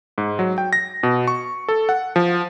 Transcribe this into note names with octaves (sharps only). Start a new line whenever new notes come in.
G#2
F#3
G5
A#6
B2
C#6
A4
F#5
F3